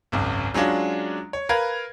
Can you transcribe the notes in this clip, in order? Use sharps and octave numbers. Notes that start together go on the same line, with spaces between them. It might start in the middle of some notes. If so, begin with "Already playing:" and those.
G#1 C#2 F#2
F#3 G#3 C#4 D4 F4
C#5
A#4 B4 F5 G#6